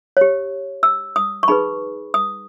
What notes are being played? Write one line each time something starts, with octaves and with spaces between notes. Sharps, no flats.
G4 C#5
E6
D#6
C#6
D#4 G#4 B4 B5
D#6